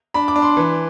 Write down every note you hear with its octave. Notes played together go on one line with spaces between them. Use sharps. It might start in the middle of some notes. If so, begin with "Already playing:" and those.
D4 B5
D6
D4
C6
E3